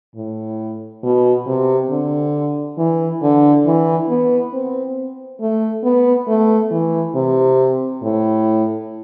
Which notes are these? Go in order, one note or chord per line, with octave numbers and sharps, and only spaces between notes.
A2
B2
C3
D3
E3
D3
E3
B3
C4
A3
B3
A3
E3
C3
A2